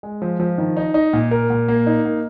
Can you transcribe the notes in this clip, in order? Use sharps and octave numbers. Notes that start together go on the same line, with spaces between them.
G#3
F3
F3
D#3
D#4
D#4
A#2
A#4
A#2
A#3
D#4
A#3